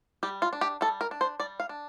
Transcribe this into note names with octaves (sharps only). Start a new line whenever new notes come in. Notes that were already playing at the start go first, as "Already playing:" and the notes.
G3 G4
F4
D4
G4
G3 A4
A#4
D4
C5
G3 D5
F5
D4